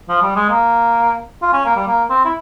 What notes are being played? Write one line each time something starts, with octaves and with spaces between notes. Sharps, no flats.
F3
G3
G#3
A#3
F4
C#4
A#3
G3
A#3
C4
E4